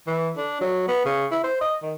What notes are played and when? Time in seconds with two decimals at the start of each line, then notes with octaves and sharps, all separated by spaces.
0.07 E3
0.37 D4
0.61 F#3
0.88 B3
1.05 C#3
1.32 E4
1.44 C5
1.61 D#5
1.82 D#3